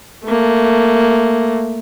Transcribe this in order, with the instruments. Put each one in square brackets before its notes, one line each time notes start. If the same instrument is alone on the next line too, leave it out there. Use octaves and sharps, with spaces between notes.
[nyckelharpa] A3 A#3